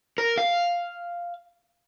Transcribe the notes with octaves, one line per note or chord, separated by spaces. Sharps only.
A#4
F5